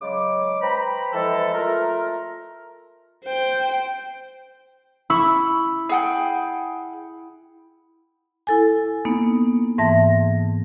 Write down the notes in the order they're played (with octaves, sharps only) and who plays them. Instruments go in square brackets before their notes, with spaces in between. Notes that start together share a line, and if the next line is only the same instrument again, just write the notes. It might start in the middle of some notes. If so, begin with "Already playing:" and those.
[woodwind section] C#3 F#3 G#3 D6
B4 C5 G5 A#5 B5
E3 F3 G#3 A4
A3 F4 A#4
[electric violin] C5 G5
[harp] E4 [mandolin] B5 C#6 E6
[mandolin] G#4 F#5 G5
[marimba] E4 A4 G#5
A#3 B3 D#4
G#2 E3 E5 A5 A#6